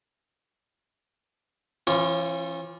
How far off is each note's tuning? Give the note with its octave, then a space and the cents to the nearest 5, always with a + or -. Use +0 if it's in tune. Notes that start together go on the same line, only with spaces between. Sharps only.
E3 +35 C#4 -30 F4 +0